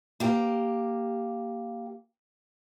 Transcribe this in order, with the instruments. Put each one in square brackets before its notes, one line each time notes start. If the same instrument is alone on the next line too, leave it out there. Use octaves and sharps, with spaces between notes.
[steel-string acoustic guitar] A#3 G4